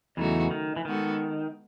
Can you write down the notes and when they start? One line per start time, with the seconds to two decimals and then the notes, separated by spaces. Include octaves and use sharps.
0.17 E2 C#3 E3 F#3 A3 D#4 F#4
0.51 D#3
0.76 E3
0.85 D#3 G#3 B3 F#4 A4